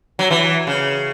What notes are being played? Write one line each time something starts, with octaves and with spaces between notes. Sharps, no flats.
F#3
E3
C#3